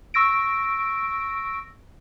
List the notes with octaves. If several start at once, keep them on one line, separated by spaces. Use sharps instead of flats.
C#6 E6 A#6 D7